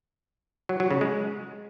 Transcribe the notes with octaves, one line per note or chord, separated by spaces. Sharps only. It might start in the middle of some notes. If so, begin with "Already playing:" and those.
F#3
F#3
C#3
G#3